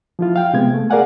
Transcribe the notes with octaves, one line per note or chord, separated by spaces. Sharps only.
F3 E4 F4
F5 G5
C3 G#3 B3 G#6
A3
G#4 A#4 D5 F5 F#5 G#5